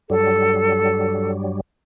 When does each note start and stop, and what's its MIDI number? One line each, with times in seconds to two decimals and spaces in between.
0.10 1.61 43
0.10 1.61 54
0.10 1.61 55
0.10 1.31 69